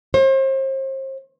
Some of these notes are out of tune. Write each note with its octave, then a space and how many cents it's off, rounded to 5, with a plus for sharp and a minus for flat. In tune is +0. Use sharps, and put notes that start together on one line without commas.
C5 +40